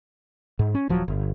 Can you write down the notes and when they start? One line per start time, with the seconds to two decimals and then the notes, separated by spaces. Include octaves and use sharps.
0.59 G#2
0.75 C#4
0.89 D#1 F3 F#3
1.08 G1